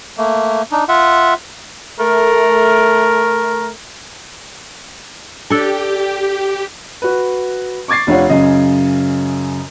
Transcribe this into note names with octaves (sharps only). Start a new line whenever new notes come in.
A3 A#3
D4 D#4
F4 E5 F#5
A3 A#4
D4 G4 A4
F#4 B4
C#6 D6 G#6 A6 C7
F1 D4 F4 C#5 F#5
F#2 C#3 D#5